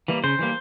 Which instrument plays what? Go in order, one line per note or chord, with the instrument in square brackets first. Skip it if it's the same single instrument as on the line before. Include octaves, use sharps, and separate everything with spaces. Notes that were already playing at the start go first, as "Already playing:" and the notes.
[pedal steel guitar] E3 G3 A#3
C#3 C5
E3 G3 A#3